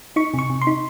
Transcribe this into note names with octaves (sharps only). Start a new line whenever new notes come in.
D#4 C#6
C3 C#6
C3
C6
D#4